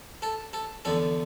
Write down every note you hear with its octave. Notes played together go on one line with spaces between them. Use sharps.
A4
A4
E2 D3 A4